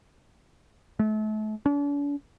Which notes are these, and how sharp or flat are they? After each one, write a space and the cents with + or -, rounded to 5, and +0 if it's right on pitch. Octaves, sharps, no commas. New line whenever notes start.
A3 -35
D4 -45